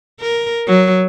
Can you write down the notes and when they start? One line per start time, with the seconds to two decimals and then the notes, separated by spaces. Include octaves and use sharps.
0.21 A#4
0.67 F#3